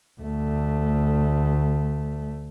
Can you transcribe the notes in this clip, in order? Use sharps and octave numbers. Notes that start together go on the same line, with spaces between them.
D2 A3